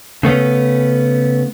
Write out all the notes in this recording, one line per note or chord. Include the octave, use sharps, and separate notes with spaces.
C#3 A3 B3 C#4